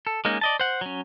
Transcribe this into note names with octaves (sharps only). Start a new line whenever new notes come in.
A4
G#3 A#3 C#4 D#4
D5 D#5 A5
C5 F#5
F#3 C#4